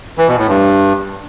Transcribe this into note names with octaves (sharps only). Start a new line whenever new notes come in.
E3
B2
A2
G2